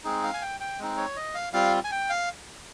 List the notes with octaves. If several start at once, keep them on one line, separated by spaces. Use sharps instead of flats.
G#3 C4 D#4 G#4
F5
G#5
G5
G5
G#3 C4 D#4
C#5
D#5
F5
G3 C4 F4 F5
G#5
G5
F5